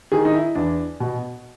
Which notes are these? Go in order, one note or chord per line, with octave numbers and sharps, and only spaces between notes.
D#3 G#4
D#4
E4
E2 D4
B2